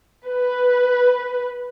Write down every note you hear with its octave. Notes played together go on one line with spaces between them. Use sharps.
B4